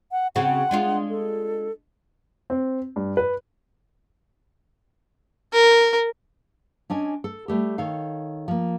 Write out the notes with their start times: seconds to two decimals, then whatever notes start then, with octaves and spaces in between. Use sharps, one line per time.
0.12 F#5
0.36 C#3 C4 F#4 F#5
0.71 G#3 D4 F4
1.10 A4
2.50 C4
2.96 G2
3.17 B4
5.53 A#4
6.90 C#4 D4 D#5 G#5
7.24 A4
7.48 G3 A3 G4
7.78 D#3 A4 C#5 F5
8.48 F3 A#3